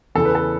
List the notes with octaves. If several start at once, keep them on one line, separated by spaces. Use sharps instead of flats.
E2 C#3 E3 A4
B4
A4